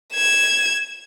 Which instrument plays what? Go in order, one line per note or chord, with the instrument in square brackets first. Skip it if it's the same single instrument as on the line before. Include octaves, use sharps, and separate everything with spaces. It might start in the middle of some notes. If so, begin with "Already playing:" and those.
[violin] G#6 E7